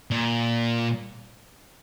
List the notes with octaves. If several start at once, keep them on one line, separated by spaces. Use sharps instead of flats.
A#2